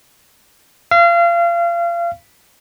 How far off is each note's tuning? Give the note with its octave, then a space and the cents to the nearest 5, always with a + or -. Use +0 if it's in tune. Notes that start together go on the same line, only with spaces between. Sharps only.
F5 -30